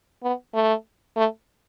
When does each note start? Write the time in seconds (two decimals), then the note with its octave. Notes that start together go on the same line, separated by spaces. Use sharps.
0.23 B3
0.54 A3
1.17 A3